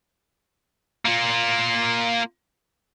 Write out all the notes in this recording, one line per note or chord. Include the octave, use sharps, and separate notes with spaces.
A#3 F4